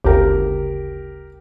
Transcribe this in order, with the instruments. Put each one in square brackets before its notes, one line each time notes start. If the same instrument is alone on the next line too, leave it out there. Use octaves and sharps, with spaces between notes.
[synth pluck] G1 D2 C#3 [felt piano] G4 A#4